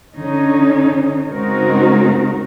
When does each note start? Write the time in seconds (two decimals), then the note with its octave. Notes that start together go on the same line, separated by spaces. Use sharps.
0.16 D3 C#4 D#4
1.29 C#3 G#3 C4 D#4 F#4 A#4